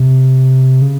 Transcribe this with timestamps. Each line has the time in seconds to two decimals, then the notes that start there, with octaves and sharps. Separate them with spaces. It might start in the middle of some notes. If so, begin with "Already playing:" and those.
Already playing: C3
0.82 C#3